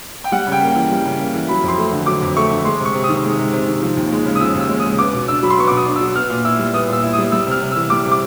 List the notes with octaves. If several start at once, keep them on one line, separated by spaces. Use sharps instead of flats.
G5
G3 F#5
C#3 G5
A#3
E3
G3
C#3
A#3
E3
F#3 B5
F2
C6
A3
D3
F#3 D6
F2
A3 C#6
D3
G#3 C6
C3 C#6
C3
D#6
D#3
G#3
C3
C3
D#3
F3
D#2
G#3
C#3
D#6
F3 E6
D#2
E6
G#3
D#6
C#3
B3 D6
B2
D4 E6
F#3 B5
C6
B3 C#6
D6
B2
D#6
D4
E6
F#3
B3 F6
A#2
E4 E6
G3
B3 D#6
A#2 E6
E4
D#6
G3
G3 E6
C3 F6
C3
E3 E6
G3 D6
C3
D6